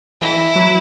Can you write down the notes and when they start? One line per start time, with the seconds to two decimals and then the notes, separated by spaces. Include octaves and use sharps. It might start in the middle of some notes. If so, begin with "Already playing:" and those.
0.21 E3 E4
0.55 F#3